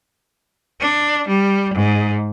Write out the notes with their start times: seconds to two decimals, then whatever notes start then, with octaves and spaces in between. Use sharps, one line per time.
0.80 D4
1.28 G3
1.74 G#2